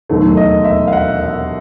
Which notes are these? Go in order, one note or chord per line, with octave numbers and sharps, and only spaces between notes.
E1 D#2 D#3 F#3 A3
D#5
E5
F5
F#5
E5